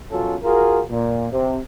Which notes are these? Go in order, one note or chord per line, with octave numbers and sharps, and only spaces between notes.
F#2 B2 F#3 C#4 F4 A4
F4 F#4 G#4 A#4
A#2
C3